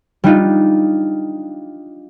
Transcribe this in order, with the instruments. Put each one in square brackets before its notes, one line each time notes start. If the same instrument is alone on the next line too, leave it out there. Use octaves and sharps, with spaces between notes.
[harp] G3 D4 D#4 F4